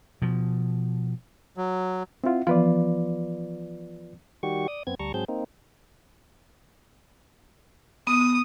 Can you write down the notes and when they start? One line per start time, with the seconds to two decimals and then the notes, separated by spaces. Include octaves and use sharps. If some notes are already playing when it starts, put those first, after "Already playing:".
0.22 B2 F3
1.57 F#3
2.24 C4 E4 F4 E5 F#5
2.47 E3 F3 B3 F4 B4 D5
4.43 D#3 G3 F#4 G4 C#6
4.68 D5 D#6
4.87 F#2 B3 C4 G#6
4.99 D2 G3 A5 A#5 C#6
5.14 G#2 F#3 C4 G#4 A5 G6
5.28 A#3 C4 D#4
8.07 B3 D#6